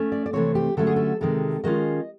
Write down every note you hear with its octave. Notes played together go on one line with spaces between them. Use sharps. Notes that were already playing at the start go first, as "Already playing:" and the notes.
Already playing: A3 C#4
D5
D5
C3 E3 A3 C4 C#5
G4
D3 F#3 A3 C#4 A4
G#4
A4
C3 D#3 G#3 A4
D#3 G#3 C#4 F4 D#5